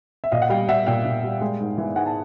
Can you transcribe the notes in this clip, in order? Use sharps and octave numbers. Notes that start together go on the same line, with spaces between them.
E5
A#2 D#5 F5
F#5
G3 F5 G5
G3 E5 F#5
A#2 F5 G5
A#2
G3
G#3
G#2
E3
G#2 F#5 G#5
A5